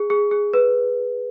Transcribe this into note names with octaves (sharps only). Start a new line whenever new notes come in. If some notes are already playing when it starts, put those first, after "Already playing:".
Already playing: G#4
G#4
G#4
B4